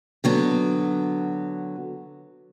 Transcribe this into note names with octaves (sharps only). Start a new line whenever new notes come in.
D3 F#3 B3